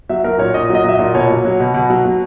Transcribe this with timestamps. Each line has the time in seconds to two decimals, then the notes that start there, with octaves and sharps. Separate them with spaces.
0.09 F#3 E5
0.24 F#3 A#4
0.39 A#2 C#5
0.54 A#2 D#5
0.70 F#3
0.75 D#5
0.84 F#3 E5
0.95 A#2 D#5
1.14 B2 C#5
1.30 F#3
1.44 F#3
1.60 B2
1.74 B2
1.90 F#3
2.05 F#3